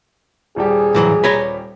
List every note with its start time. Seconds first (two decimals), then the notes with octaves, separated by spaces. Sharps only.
0.56 D#1 G3 G4 G#4
0.95 A2 E3 F#3
1.24 B4 C#5 A#5